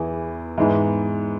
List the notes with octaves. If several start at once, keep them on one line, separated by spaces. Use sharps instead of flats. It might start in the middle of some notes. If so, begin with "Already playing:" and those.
Already playing: E2 E3 B3 E4 G#4
G#2 E3 G#3 B3 E4